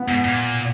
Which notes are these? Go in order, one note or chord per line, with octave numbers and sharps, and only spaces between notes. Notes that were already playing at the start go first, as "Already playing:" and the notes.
Already playing: B3
G#2
A#2